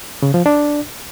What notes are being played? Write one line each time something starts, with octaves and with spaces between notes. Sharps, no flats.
C#3
F3
D4